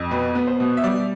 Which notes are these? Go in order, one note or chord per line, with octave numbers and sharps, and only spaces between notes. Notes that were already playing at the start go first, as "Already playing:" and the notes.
Already playing: F2
B2 B4
B3
C5
B2
E5
G3 D5